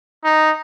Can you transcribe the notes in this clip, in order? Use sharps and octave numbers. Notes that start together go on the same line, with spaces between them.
D#4